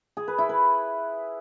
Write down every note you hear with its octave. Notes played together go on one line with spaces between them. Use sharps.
G#4
B4
E4
B4